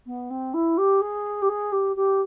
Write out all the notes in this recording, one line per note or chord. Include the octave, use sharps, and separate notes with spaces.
B3
C4
E4
G4
G#4
G4
G#4
G4
G4